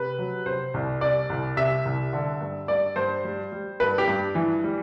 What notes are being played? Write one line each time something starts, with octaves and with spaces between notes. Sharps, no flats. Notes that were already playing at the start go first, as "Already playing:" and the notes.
Already playing: C3 B4
F#3
C3 C5
C2
C3 D5
C2
C3 E5
C2
D3
G2
G2 D5
G2 C5
G3
G3
G2 B4
G4
G2
E3
G3